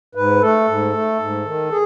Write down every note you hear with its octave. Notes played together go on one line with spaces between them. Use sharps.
G#2 B4
A3 A4
G#2
A3
G#2
D#3
G#4